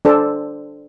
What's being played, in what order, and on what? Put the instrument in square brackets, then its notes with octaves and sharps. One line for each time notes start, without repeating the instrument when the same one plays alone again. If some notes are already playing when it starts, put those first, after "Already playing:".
[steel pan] D4 A4 C5